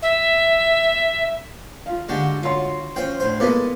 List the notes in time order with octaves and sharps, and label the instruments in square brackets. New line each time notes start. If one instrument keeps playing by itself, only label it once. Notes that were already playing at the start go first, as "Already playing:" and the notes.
[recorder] E5
[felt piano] F4 F5
[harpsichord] D3 G#3 [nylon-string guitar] D4 F#4 G4
[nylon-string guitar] F4 [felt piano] F#4 C#5 C6
[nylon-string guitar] F3 C#4 [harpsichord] C5 G5
[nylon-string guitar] D2 A2 D3 [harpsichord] C5
[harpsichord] G#3 E4 D5 [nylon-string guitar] A#3 [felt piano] B3 A4 B4